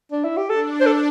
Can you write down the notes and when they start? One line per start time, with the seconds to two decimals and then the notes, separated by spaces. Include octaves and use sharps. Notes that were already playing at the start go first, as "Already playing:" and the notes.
0.12 D4
0.24 E4
0.37 G4
0.50 D4 A4
0.80 C5
0.86 A4